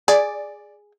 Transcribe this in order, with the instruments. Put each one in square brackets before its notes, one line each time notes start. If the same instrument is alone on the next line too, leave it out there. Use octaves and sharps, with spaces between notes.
[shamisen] G#4 [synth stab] D5